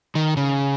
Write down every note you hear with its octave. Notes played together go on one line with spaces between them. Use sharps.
D#3
C#3